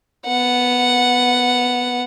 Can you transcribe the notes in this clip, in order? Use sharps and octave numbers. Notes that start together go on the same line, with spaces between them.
B3 F#5